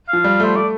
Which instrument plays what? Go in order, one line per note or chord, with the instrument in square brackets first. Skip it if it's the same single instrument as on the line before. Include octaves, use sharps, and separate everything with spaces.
[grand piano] F3 [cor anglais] F5
[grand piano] G3
[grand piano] A3 [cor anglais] C5
[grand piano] A3 [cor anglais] D5